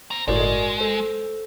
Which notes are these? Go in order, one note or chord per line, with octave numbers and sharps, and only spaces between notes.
C5 A#5
G1 A2 G#3 F#4 A#4 D5
D#5
A4 C5